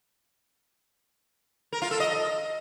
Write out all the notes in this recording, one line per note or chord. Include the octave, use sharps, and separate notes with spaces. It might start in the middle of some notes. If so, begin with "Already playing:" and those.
A#4
F4
A4
D#5